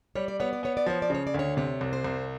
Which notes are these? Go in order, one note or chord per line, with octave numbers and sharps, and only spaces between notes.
G3 C#5
D5
B3 C#5
D5
B3 C#5
D5
F3 C#5
D5
C#3 C#5
D5
D2
C#5
C3 C#5
C2
C5
C2